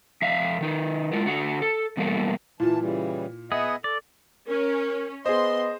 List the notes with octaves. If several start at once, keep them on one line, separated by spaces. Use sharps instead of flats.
F2 E5 F5
D#3 D#4 B4
G#3 E4 F4 A#4
D3 F#4 F#5
A4
E2 B2 G3 A3 A#3
A#2 E3 E4 F4 A5
C#3 E3 G3
B3 G#4 D#5 E5 F#5
A4 D5
C#4 A#4
B3 G#4 C5 D#5 C6